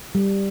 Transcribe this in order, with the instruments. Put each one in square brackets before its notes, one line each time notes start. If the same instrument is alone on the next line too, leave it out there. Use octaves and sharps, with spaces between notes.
[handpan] G3